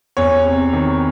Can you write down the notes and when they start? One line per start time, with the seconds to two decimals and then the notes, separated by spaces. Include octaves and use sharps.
0.17 E2 C#5
0.45 C3
0.73 D#3